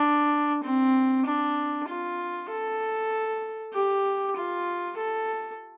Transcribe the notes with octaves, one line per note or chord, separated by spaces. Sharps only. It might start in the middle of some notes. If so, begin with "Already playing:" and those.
Already playing: D4
C4
D4
F4
A4
G4
F4
A4